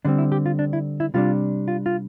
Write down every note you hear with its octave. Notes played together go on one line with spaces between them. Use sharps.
D3 G3 C4 D4
E4
G4
F4
D4
E4
E4
C3 G3 D4 F4
F4
F4